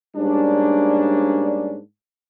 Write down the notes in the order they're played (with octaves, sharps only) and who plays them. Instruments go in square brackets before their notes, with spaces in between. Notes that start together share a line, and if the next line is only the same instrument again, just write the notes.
[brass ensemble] G#2 G3 A#3 C#4 D4